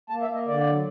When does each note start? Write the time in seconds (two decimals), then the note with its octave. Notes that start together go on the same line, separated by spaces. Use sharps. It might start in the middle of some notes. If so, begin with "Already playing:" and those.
0.10 A#3 A5
0.21 E5
0.29 A#3
0.34 D#5
0.47 D3 D5
0.66 F#3